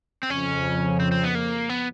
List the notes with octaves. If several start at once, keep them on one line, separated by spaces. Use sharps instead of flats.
C4
F2 C#3 F3 C#4
C4
C4
B3
A#3
B3